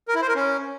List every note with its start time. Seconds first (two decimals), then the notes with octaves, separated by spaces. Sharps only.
0.08 A#4
0.15 E4
0.22 C5
0.29 A#4
0.35 C#4